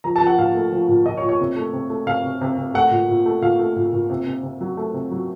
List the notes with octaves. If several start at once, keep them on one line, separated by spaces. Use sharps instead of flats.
F3 A#5
A5
F3
F#5
A#2 F5
A3
F3
A#2
A#2 D#5
C#5
A#2
C#5
C3
A3
C3
A3
C3 F5
C3
C3
C3
A3 F#5
A#2
A#2
A3
A#2 F5
A3
A#2
A#2
C3
C3
C3
F#3
A3
C3
F#3